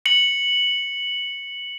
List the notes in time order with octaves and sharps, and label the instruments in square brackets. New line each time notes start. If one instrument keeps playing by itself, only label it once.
[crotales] C#7 F#7